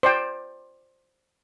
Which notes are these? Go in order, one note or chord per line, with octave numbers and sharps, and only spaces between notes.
C5 D5 G5